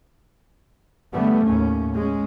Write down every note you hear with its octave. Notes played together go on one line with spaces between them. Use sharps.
D3 G3 A3 B3
D#2 A2 C#4
G#3 C#4